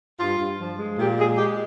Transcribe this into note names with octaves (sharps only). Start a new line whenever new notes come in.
G2 F4
G2
F3
G#3
A#2 G4
G#3 G#4
G#3 G4